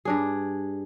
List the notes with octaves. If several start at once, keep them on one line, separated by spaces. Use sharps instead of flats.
G2 D4 G#4